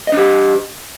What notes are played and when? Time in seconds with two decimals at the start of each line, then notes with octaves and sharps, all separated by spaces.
0.07 D#5
0.12 D4
0.17 G4